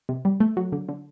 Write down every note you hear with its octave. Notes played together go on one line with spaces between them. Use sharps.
C3
G3
A3
F#3
D3
D3